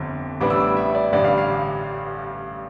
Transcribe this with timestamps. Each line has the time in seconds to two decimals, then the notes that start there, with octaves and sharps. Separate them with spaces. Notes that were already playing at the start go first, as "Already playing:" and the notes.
Already playing: G1 F2 D3
0.40 A1 A2 G3 B3 D4 D6
0.50 E6
0.60 D6
0.77 E5
0.95 D5
1.12 A1 G2 D3 G3 D5
1.25 F5
1.37 F5